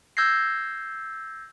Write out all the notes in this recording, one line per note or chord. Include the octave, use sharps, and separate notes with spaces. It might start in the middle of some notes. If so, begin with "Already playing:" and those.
E6 G6 G#6 A#6 C7